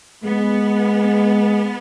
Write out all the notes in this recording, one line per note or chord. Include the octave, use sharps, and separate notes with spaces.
G#3 B3